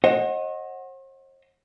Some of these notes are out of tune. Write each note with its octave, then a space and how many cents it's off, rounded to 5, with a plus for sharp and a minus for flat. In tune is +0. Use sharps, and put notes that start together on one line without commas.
C5 +45 D#5 +0 F#5 -10